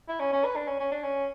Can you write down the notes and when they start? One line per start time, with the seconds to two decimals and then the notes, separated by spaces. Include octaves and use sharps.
0.09 E4
0.20 C#4
0.33 C#4
0.45 B4
0.56 D4
0.68 C#4
0.80 C#4
0.92 D4
1.04 C#4